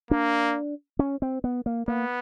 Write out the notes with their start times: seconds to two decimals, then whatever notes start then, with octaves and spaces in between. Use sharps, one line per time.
0.11 A#3 D4
0.99 C#4
1.22 C4
1.44 B3
1.66 A#3
1.88 A#3 B3